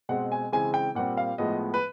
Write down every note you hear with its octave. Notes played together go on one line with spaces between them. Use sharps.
B2 G#3 C4 F#5
G#5
C#3 E3 G#3 C4 G#5
G5
A#2 G3 C4 F#5
F5
A2 F3 G#3 B3 D#5
B4